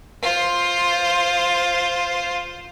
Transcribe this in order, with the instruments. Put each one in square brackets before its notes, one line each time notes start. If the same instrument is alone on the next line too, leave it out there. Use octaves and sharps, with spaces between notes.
[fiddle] F4 C5